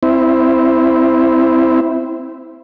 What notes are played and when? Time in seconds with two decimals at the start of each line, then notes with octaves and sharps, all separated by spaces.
0.03 C4 E4